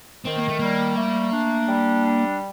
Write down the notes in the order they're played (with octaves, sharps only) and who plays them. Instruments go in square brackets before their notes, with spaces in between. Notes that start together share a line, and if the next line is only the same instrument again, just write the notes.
[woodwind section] D#3 [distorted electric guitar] C4
[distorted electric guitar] A#3
A3
[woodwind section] G3 [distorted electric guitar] A#3
[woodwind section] A3
D4
G3
D4